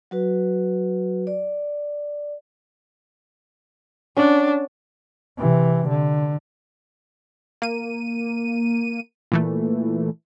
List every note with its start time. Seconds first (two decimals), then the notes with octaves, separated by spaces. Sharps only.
0.11 F#3 F#4 B4
1.27 D5
4.17 C#4 D4 F#5
5.38 C3 E3
5.89 D3
7.62 A#3 D#7
9.32 A#2 E3 A3